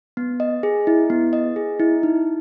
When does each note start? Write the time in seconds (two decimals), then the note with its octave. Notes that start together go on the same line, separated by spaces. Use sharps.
0.17 B3
0.40 D#5
0.63 G#4
0.87 E4
1.10 B3
1.33 D#5
1.56 G#4
1.80 E4
2.03 D#4